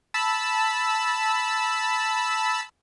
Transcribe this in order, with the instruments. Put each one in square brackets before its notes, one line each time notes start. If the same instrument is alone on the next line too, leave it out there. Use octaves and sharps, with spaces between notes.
[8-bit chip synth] A5 B5 E6